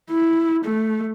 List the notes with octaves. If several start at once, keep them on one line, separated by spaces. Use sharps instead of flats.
E4
A3